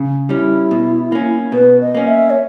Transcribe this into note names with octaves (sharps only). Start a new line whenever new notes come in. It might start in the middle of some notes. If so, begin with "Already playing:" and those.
Already playing: C#3
G3 C#4 E4
B2
A#3 C#4
B2 B4
D#5
A#3 C#4
E5
C#5